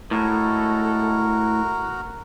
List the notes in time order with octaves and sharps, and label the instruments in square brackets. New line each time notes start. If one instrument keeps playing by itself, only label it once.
[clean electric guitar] A2 [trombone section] G#3 A4 [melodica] F#4 A#4